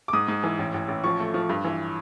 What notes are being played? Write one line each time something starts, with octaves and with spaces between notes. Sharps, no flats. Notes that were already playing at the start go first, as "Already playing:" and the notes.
D6
G#2 D#6
G#2
E3
A1
A1
A1
F3 C#6
A3
F3
G2
E3